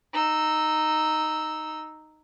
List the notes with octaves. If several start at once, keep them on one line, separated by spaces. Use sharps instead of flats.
D#4 E6